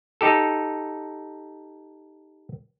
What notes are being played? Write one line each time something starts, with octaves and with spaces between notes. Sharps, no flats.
D#4 G4 A4